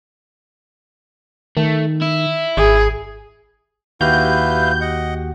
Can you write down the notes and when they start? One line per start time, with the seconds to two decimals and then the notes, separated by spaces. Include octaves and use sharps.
1.57 D#3 A3
2.02 E4
2.57 G#1 G#4
4.01 D#2 E4 F#4 G4 B4 F5 G6
4.81 D#5 F#5